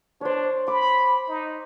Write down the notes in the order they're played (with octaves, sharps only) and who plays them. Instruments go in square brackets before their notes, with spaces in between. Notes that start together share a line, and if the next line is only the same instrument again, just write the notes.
[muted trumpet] D4 [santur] C5 C#5
[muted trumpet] B5 [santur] D6
[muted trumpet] D#4